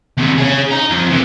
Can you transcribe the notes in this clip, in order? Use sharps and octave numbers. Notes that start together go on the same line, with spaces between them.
D#2 C3
C#4 G#4
D#5 A#5
F2
C3 E3